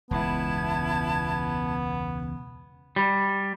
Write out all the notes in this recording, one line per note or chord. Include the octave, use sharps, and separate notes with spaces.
E1 C#2 C#3 B3 E4 A5 G#6
G3